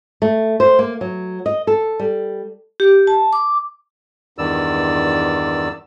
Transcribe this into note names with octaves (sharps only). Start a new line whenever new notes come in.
A3
C5
A#3
F#3
D#5
A4
G3
G4
A5
D6
E2 G2 D#3 D5 E6